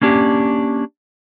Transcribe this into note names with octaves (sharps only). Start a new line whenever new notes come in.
A#3 C#4 D4 G4